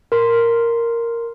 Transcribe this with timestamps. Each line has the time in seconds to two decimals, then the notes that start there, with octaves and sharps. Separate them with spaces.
0.12 A#4 C6